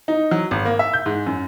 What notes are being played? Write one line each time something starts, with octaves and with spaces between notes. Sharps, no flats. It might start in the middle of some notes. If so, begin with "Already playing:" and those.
D#4
F#3
G#1
A#3
E5
G6
G#2
F#2